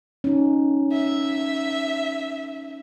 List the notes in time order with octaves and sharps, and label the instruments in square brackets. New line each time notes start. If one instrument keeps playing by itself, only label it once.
[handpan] C#4 D#4
[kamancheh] E5